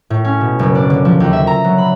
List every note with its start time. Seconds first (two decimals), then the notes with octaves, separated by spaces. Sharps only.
0.10 A2
0.24 C#4
0.41 B2
0.59 F#1
0.75 D4
0.90 D3
1.05 F3
1.20 D#2
1.33 E5
1.47 A#5
1.64 F#3
1.78 B5